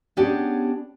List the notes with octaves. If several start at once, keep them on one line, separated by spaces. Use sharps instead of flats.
B3 C#4 D4 G4 G#4